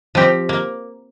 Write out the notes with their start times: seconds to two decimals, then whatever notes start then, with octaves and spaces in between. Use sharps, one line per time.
0.15 F3 C4 G4
0.49 A#3